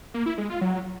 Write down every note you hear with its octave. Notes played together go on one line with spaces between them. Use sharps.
A#3
E4
G#3
F4
F#3